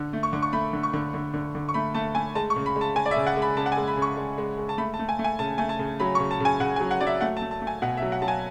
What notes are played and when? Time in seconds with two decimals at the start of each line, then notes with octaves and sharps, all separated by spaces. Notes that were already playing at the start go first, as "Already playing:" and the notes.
Already playing: D3
0.13 A3
0.23 C#6
0.33 D3
0.42 C#6
0.53 A3 B5
0.73 D3
0.83 C#6
0.93 D3
1.14 D3
1.34 D3
1.55 D3
1.69 C#6
1.74 A3 B5
1.94 A3 A5
2.15 A3 G#5
2.35 G#3 A5
2.50 C#6
2.56 C#3
2.66 B5
2.76 G#3
2.81 A5
2.96 G#3 G#5
3.06 D5
3.11 E5
3.17 C#3
3.26 F#5
3.36 G#3
3.42 B5
3.57 C#3 A5
3.66 F#5
3.72 G#5
3.77 G#3
3.88 B5
3.97 C#3 C#6
4.17 G#3
4.38 G#3
4.58 G#3
4.69 A5
4.78 A3 B5
4.94 A5
4.99 A3
5.09 G#5
5.19 A3
5.24 G#5
5.39 C#3 A5
5.58 A3 G#5
5.69 A5
5.79 C#3
6.00 F#3 B5
6.15 C#6
6.20 C#3
6.31 A5
6.40 C#3 G#5
6.60 C#3 F#5
6.76 G#5
6.81 F#3
6.91 F#5
7.01 F#3 D5
7.07 E5
7.21 A3 F#5
7.37 A5
7.42 A3
7.51 A5
7.62 A3
7.67 G#5
7.82 B2 F#5
7.97 E5
8.02 F#3
8.12 F#5
8.22 F#3 A5
8.28 G#5